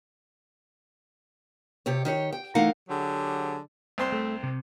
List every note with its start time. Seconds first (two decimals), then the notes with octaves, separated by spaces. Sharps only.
1.86 C3 G4 C#5
2.05 D#3 G4 C#5
2.32 G5
2.55 E3 A3 D#4 A#4 F5 F#5
2.89 D3 F#3 G4 G#4
3.98 C2 C4 C6
4.12 A3
4.43 C3